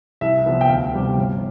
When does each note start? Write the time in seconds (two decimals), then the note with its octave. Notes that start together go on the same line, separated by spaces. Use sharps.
0.21 C2 E5
0.46 C3 F3 B3
0.61 G5
0.69 D2 F5
0.93 C3 G3 B3
1.17 G1